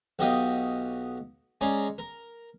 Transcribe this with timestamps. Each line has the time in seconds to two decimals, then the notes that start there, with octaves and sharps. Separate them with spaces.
0.19 B1 F#4 G4 D#5 F5 G5
1.61 G#3 C#4 D5 A#5 C6
1.98 A#4